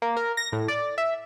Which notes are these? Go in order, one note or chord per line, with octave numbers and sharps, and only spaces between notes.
A#3
A#4
A#6
A2
D5
E5